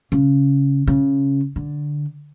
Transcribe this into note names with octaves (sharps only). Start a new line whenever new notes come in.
C#3
C#3
D3